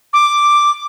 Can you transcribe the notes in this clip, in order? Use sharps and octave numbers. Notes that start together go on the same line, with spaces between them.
D6